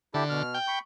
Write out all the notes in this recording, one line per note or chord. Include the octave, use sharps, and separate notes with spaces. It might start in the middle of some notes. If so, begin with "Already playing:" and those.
D3 E4 G4 A4
B2 F6
G5
B5 C#6